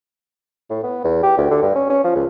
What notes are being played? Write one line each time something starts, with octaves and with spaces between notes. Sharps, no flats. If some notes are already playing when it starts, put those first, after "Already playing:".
A2
B3
E2
G4
D2
D3
G2
C#4
C#4
F3
C#2